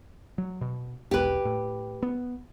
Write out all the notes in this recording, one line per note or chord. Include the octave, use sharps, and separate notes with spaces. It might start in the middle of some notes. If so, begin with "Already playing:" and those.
F#3
B2
E1 B1 G4 B4
A2
B3